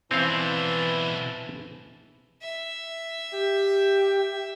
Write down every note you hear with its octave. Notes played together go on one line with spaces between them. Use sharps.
B2 E3 C4 D4 C#5 F5
E5
G4